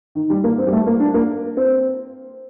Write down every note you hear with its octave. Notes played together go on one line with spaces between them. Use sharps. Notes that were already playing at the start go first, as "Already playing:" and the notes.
D#3
G3
A#3
C4
G3
A3
A#3
D4
A#3
C4